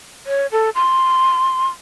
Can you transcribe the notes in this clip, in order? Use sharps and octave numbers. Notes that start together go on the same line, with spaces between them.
C#5
A4
C6